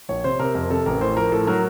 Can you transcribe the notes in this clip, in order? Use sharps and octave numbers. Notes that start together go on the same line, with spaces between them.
A#1 C#5
C3 C5
C3 A#4
F2 A#4
C3 A4
A1 A#4
A2 C5
F3 A#4
A2 A4
F#3 A#4